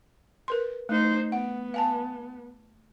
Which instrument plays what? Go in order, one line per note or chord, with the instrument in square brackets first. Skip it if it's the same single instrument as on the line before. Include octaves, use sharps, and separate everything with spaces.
[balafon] A#4 B4 C6
[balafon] A3 [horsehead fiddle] D#4 C5
[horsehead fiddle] B3 [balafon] F#5
[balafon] F5 G#5 A5